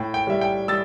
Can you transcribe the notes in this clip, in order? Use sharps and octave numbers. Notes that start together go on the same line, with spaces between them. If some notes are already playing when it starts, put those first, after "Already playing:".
Already playing: A2 G5
G5
G3 E5
G5
G3 E6 A6